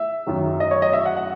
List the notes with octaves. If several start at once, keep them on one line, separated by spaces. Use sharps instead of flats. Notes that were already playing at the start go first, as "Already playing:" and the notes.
Already playing: E5
F#2 D#3 F#3
D#5
C#5
D#5
E5
F#5
F#5